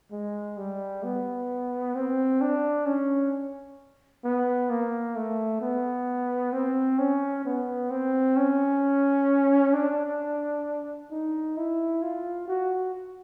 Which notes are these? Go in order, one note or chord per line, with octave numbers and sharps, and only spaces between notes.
G#3
G3
B3
C4
D4
C#4
B3
A#3
A3
B3
C4
C#4
B3
C4
C#4
D4
D#4
E4
F4
F#4